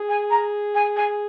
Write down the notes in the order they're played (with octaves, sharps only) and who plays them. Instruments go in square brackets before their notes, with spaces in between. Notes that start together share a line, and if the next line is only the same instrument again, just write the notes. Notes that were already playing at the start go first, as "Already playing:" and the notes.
Already playing: [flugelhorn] G#4
[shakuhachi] G#5
A#5
G#5
G#5